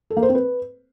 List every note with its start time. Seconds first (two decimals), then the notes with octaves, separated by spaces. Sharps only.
0.10 A4
0.17 A#3
0.23 C5
0.29 C4
0.35 B4